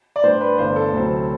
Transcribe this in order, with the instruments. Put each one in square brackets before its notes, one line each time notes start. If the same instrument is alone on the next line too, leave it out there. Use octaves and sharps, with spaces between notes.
[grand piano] D5
A2 G3 D4 C5
B4
G1 G2 E3 A3 D4 C5
A4
D2 C3 F#3 C4 E4